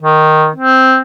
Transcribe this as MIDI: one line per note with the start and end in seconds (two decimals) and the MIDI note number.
0.02 0.48 51
0.56 0.99 60